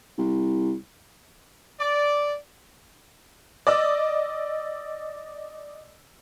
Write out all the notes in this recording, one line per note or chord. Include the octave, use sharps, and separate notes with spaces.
C2
D5
D5 D#5 E6